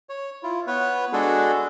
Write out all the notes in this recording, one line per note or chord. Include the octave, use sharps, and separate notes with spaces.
C#5
E4 F4
B3 B4 C#5
G#3 D4 F#4 G#4 A4